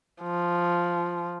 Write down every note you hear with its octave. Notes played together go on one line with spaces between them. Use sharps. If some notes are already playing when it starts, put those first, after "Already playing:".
F3